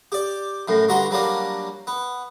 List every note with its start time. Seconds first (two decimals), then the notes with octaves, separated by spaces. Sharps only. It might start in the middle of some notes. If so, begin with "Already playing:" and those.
0.12 G4 D5
0.68 F#2 A2
0.89 G2 D3 F#4 A#5 C6
1.11 F#3 G3 A#3 D4
1.87 B3